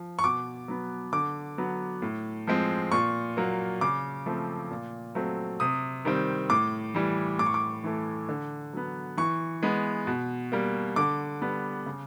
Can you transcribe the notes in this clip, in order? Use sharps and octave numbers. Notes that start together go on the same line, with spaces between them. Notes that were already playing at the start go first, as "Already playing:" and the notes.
Already playing: F3
C#6
B2 D6
F#3 B3
D3 D6
F#3 B3
A2
F3 G#3 C4
A#2 C#6
F#3 A#3
C#3 D6
F3 A3 C4
A#2
F#3 A3 C4
C3 D#6
D#3 G3 C4
A2 D6
E3 G3
A2 D6
C#6
D6
E3 A3
D3
F#3 B3
E3 C#6
G#3 B3
B2
G3 A#3
D3 D6
G3 B3
C#3